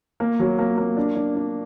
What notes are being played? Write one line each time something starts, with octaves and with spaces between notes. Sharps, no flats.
A#3
F#3
A#3
A#3
D4
D4
D4